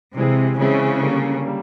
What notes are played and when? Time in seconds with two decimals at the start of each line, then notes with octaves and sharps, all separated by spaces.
0.17 C3 E3 G#3 C4 E4 G#4
0.59 C#3 E3 G#3 C4 E4 G#4
1.01 D3 G3 A#3
1.44 G3 A#3